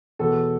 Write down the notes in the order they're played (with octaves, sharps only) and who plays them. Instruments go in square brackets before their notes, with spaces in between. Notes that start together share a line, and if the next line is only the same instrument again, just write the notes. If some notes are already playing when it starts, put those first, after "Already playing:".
[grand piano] E2 B2 A4